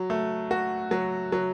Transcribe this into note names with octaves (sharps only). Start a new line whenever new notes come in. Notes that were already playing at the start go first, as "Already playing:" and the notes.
Already playing: F#3
A3
F#4
F#3
F#3